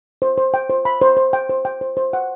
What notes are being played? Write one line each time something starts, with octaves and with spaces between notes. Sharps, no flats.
C5
C5
G5
C5
B5
C5
C5
G5
C5
G5
C5
C5
F#5